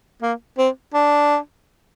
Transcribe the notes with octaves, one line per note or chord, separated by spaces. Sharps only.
A#3
C4
D4